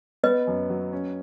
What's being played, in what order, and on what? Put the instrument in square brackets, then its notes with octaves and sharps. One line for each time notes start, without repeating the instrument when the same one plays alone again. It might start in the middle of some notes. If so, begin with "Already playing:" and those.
[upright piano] B3 [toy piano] B4 D#5
[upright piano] F#2
F#3
C#4